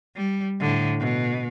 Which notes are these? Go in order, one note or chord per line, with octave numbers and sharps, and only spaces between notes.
G3
A2 D3
B2